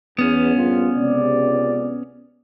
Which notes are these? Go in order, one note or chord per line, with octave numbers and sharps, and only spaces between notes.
E2 B3 C#4
A#1 G2 F4
C#2 C3 D5